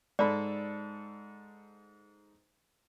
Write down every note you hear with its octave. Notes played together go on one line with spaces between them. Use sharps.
G#2 A4 D5 B5